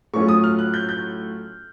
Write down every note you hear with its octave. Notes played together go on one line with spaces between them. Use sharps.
A2 F#3 A3 C#4 F4 C#6
D#6
F6
F#6
G6
G6